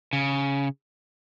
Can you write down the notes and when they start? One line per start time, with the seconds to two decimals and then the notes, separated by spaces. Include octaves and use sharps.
0.13 C#3